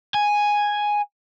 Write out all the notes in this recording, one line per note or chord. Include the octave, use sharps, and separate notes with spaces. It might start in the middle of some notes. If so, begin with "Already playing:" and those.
G#5